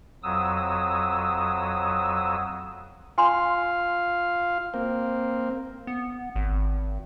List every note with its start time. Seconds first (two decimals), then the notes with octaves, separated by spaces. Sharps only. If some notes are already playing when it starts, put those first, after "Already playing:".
0.23 F2 F#3 D#6 E6
3.18 F4 F5 G#5 C6
4.74 A#3 C4
5.87 B3
6.36 G#1